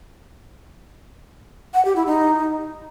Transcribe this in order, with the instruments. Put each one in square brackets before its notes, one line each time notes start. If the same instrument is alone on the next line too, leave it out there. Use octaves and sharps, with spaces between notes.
[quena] F#5
G4
E4
D#4